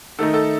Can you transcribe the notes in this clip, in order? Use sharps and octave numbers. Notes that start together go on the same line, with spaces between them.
D#3 A3 D#4 A4
A4